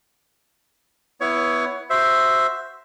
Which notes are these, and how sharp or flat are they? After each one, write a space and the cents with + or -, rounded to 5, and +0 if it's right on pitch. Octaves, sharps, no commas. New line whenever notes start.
B3 +0 E4 +0 C#5 +20
F#4 +0 C5 +0 E5 +0